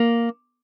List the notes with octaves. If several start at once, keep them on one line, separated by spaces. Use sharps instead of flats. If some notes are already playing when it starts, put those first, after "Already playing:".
Already playing: A#3